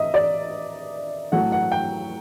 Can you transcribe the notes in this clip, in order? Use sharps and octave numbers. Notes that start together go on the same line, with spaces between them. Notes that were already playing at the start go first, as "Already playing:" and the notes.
Already playing: D#5 E5
D5
A2 F#3 A3 F#5
F#5
G5